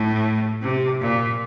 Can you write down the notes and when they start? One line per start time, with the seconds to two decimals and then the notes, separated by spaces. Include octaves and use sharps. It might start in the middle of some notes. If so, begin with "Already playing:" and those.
Already playing: A2
0.61 C3
1.00 A#2